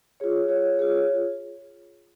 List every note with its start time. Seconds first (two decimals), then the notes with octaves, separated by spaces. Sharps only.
0.20 F4 G#4 C#5
0.48 F4 G#4 C#5
0.79 F4 G#4 C#5